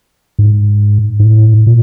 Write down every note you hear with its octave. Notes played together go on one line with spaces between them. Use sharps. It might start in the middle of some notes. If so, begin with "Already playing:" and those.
G#2
G#2
A2
A#2